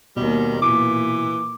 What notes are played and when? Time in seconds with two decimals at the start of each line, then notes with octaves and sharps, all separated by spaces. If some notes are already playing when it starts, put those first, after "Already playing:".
0.17 D#2 B2 D#3 G3
0.62 A#2 E3 D6